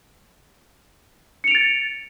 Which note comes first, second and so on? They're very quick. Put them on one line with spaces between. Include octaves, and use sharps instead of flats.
C#7 F7 D7 A6